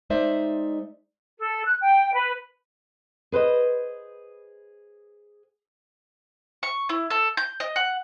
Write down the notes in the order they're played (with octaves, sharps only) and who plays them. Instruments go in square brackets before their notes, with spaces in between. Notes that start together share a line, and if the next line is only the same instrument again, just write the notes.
[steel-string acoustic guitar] G#3 D#4 C5 D5 E5
[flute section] A4
F#6
G5
B4
[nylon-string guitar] G#4 B4 C5 D#5
[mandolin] C#6
E4
A4
G6
D#5
F#5